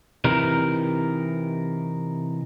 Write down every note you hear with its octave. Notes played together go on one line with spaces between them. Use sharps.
C3 E3 D#4 A#4